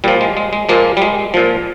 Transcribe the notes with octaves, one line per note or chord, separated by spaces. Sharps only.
A#2 F3 G3
G#3
G#3
G#3
A#2 F3 G#3 A#3
G3
G#3
A#2 F3